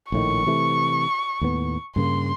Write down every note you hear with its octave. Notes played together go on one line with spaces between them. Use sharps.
A#1 A2 D#3 C#6
C3 E3 A3
D#2 A2 B3
G2 C#3 A#3 C6